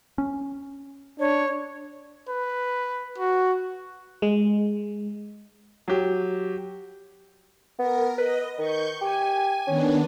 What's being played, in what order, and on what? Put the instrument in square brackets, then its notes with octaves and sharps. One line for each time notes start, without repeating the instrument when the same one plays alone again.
[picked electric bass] C#4
[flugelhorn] D4 [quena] C#5
[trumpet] B4
F#4
[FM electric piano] G#3
[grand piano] F#3 G4
[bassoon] B3 [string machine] A#4
[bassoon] B4 [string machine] D#5
[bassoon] D#3 [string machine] C#6 G6
[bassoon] G4 [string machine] G#5
[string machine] D#3 B3 D4 [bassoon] C#4